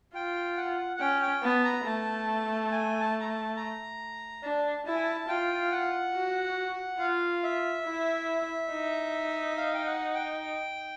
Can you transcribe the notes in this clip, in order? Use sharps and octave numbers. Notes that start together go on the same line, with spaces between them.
F4 G5
F#5
F#5
C#4 G5
G5
B3 A5
A#5
A3 A5
G#5
A5
A#5
A5
A#5
D4 A5
E4 A5
G#5
A5
F4 G5
F#5
F#4
F4 F5
E5
E4
D#4
F5
G5
F#5
G5